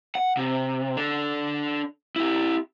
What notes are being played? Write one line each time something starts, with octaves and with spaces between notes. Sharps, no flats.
F#5
C3
D4 A4
E4 G4